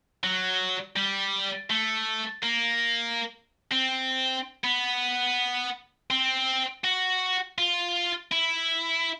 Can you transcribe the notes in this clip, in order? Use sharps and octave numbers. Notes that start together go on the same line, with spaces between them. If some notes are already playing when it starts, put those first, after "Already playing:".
F#3
G3
A3
A#3
C4
B3
C4
F#4
F4
E4